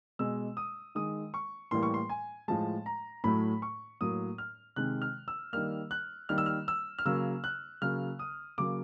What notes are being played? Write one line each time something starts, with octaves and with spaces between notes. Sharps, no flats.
B2 G#3 E6
D#6
D#3 G#3 D#6
C#6
A2 E3 G3 A#3 C6
C#6
C6
G#5
A2 F3 G#3 A5
A#5
A2 F#3 A3 B5
C#6
A2 F#3 A#3 D#6
F6
C3 D#3 G#3 F#6
F6
E6
D#3 G3 A#3 F6
F#6
D#3 G3 A#3 F6
E6
F6
E6
F6
C#3 F#3 A#3 E6
F#6
C#3 F#3 A#3 F6
D#6
C#3 F#3 A#3 D6